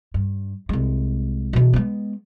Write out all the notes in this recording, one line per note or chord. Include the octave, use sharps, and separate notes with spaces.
G2
C2 G#3
B2 E3
G#3 B3